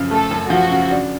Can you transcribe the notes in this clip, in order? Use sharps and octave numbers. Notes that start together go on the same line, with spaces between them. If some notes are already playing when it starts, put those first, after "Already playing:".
Already playing: F#2 C#3 F3
A3 A4
F#2
F3 F#4
C#3
D4